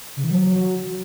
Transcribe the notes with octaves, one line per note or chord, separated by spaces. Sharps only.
C#3
E3
F#3